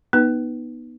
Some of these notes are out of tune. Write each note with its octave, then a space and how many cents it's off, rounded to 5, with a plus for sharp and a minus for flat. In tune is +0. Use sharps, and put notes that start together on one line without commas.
B3 -20 D#4 +0 B4 +0